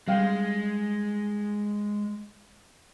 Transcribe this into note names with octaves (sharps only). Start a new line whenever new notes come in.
G3 G#3 F5 G5